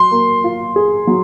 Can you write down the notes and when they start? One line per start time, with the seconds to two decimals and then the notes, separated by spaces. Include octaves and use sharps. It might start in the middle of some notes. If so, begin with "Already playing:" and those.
Already playing: F#3 C6
0.11 A#3
0.44 F4
0.76 G#4
1.07 F#3